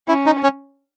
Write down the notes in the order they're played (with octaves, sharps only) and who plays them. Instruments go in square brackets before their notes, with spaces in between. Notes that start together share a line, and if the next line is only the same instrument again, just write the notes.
[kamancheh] C#4 [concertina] E4
[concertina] D#4
C#4